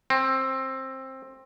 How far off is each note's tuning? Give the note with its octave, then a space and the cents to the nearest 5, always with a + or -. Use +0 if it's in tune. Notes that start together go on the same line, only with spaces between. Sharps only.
C4 +15